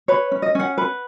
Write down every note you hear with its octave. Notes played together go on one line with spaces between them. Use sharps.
B4 C#5
C#4
D#5
C#4 F#5
B4